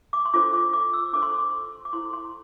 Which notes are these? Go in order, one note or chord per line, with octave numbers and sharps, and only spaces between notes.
D6
C6
D4 F4 A4 C5 D6
D6
D6
E6
D4 A4 C5 D6
C6
D6
D6
E4 A4 C5 C6
C6